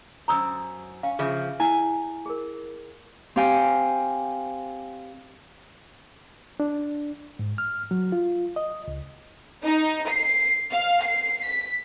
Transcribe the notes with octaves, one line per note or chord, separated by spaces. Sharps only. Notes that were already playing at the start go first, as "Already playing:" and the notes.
F#2 B2 C5 A#5 D#6 E6
C#4 F5
C#3 F3 G#4 E5
E4 G#5
G#4 A#4
C4 G4 F5 G5 G#5
D4
G#2
F6
F#3
F4
D#5
C#2
D#4
C7
F5
C7
B6